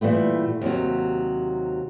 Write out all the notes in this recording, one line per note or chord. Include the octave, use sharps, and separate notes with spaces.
A#2 E3 G3 A3 B3
D#2 C3 F#3